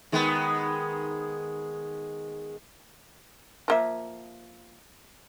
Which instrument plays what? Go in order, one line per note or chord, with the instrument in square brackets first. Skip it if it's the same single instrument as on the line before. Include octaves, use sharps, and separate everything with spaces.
[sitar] D#3 G#3 B3
[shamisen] F3 A#3 E5